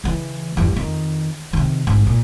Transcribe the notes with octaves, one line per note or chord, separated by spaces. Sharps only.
C#3 E3
E2 G2
F2 D#3
C3 D#3
A1 G#2
A#2